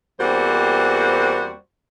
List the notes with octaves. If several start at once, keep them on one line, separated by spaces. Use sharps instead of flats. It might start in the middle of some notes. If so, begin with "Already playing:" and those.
E2 G3 A#3 C4 F#4 C5